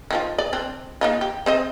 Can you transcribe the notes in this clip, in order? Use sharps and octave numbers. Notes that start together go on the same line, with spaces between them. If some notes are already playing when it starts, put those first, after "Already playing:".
D#3 F3 F4
D5
C4 D4
A#3 D#4 F4
G4
C4 C5 D#5